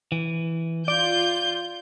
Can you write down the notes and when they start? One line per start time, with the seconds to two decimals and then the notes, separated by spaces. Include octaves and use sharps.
0.12 E3
0.88 F4 D5 G6